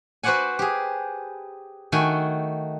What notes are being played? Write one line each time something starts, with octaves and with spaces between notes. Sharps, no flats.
F#4 B4 C5 D5 F#5 G#5
G4 G#4
D#3 A3 F#4 G5 G#5